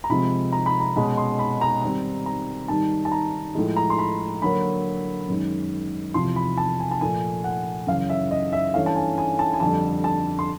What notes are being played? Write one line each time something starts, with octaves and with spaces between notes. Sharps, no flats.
A#5
C3 F3 G#3 C4 B5
A#5
B5
A#5
B2 G#3 C#4 B5
C6
B5
A#5
G#2 D#3 G3 C4 A#5
A#5
G#2 D#3 G3 A5
A5
A#5
A2 F3 G#3
A#5
C6
B5
D3 F#3 A#3 B5
F#2 D#3 G#3
E2 C3 F3 C6
B5
A5
G#5
A5
A#2 F3 A3 G#5
F#5
F#2 C#3 E3 F5
E5
D#5
E5
G2 E3 A3 C#4 F5
A5
G#5
G#5
A5
G#5
F2 D3 G3 A5
A5
C6